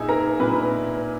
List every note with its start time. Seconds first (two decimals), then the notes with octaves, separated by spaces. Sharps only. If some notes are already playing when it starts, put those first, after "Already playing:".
Already playing: A#2 D#4 E4 G#4 E5 G#5
0.09 A#4 A#5
0.40 A#2 B4 B5